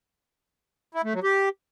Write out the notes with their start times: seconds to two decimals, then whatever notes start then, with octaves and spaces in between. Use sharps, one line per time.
0.95 E4
1.04 A3
1.14 F#3
1.23 G4